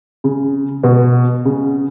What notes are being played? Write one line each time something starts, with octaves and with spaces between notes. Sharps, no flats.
C#3
B2
C#3